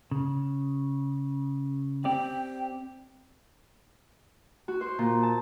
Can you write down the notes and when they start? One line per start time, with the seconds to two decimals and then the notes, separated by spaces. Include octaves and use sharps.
0.11 C#3
2.05 C4 G4 D5 G5
4.68 F#4
4.81 C5
4.99 A#2
5.23 A5